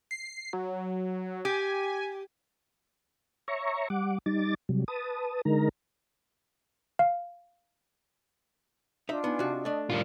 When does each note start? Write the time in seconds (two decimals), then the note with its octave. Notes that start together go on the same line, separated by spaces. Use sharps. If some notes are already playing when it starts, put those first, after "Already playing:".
0.11 C7
0.53 F#3
1.45 G4 G#5
3.48 C#5 E5 A#5 C#6
3.90 G3 F#5 D6
4.26 G3 D#4 D6 A6
4.69 C3 F#3 G3
4.88 B4 A5 D#6
5.45 D3 G#3 D#4 A#4 A#5
6.99 F5
9.09 D4 D#4 F4 E5 A5
9.24 B3 D#4 G#5
9.39 C3 F#4
9.52 D#5
9.65 A3 D4
9.90 A2 G3 C#4 F4 A#4 D5 E7